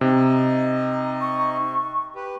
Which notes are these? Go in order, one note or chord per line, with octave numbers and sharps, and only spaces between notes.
C3 D#4 D#5
C#6
G4 B4